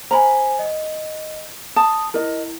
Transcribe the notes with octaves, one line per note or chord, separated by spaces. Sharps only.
C5 G#5 A#5 B5
D#5
A5 D#6
E4 A#4 D#5